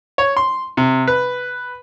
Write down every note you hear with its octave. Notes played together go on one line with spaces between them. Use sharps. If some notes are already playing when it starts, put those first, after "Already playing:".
C#5
C6
C3
B4